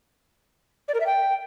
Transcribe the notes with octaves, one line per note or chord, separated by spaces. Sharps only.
D5
A#4
E5
G5